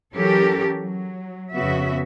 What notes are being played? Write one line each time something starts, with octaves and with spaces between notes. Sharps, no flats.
E3 F#3 C#4 G4 A4 A#4
F#3
F2 C#3 B3 F#4 E5